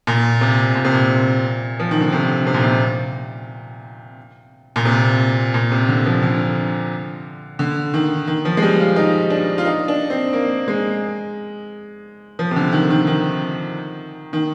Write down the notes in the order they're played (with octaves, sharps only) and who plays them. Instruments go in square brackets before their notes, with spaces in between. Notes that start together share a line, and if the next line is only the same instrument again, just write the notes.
[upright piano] A#2
C3
A#2
C3
A#2
F3
D#3
D3
C3
C3
A#2
C3
A#2
C3
A#2
C3
D3
F3
D3
D3
D#3
D#3
F3
G#3
G3
F4
D#4
D4
F4
D#4
D4
C4
A#3
G#3
F3
C3
D3
D#3
D#3
D#3
D#3